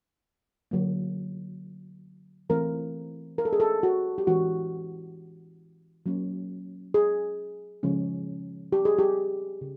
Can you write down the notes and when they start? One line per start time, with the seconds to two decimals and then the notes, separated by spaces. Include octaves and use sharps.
0.71 D3 F#3 A#3
2.49 E3 A3 C4 A#4
3.38 A#4
3.45 A4
3.53 G#4
3.60 A4
3.83 F#4
4.18 G4
4.27 E3 G#3 C#4 F#4
6.06 F#3 A#3 C#4
6.94 G#4
7.83 C#3 F3 G#3 C#4
8.72 G4
8.85 G#4
8.99 G4
9.61 C#3